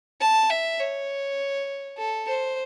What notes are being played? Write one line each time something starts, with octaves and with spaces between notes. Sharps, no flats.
A5
E5
C#5
A4
C5